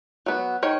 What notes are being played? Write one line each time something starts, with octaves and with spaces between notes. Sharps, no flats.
F#3 B3
D#3 C#5